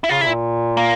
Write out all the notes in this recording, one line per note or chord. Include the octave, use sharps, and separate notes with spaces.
E4
C#3 F4
C#3 E4
A#2
A#3